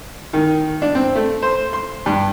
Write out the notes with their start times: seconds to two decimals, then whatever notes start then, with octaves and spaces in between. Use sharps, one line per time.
0.33 D#3
0.82 D4
0.95 C4
1.15 A3
1.42 C5
1.73 C6
2.06 G2